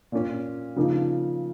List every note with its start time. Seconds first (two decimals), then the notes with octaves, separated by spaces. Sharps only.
0.12 A#2 A#3 C#4
0.76 C#3 F3 A#3 D#4